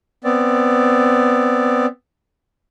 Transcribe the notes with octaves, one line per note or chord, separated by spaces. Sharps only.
B3 C4 D5